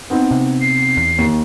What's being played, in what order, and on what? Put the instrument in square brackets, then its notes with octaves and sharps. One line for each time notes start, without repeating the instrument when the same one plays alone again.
[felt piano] B3 C4 D#4
[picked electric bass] C3
[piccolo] C7
[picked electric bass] E2
[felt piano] D#2